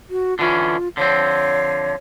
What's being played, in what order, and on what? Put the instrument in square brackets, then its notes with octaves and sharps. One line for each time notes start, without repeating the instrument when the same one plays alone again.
[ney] F#4
[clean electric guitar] D3 E3 C#4 [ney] F4
[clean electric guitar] D3 F3 C4 [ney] C#5